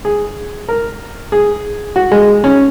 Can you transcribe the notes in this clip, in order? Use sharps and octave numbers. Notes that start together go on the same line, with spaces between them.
G#4
A#4
G#4
F#4
G#3
C#4